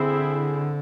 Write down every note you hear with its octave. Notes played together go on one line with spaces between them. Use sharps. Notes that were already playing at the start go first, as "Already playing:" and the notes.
Already playing: D3 C4 E4 G#4